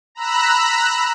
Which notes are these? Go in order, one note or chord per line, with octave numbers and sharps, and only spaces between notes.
A#5 B5 E6 F#6